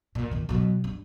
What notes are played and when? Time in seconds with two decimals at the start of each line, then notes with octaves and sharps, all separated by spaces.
0.15 A#2
0.31 A#2 D#3
0.49 B2 F#3
0.84 G2